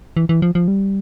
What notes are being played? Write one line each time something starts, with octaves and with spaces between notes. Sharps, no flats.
E3
E3
F3
F3
G3